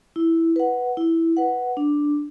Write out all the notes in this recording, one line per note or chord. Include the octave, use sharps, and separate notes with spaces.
E4
B4 F#5
E4
B4 F#5
D4